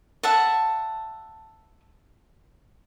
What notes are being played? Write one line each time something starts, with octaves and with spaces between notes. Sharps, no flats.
E5 F#5 A5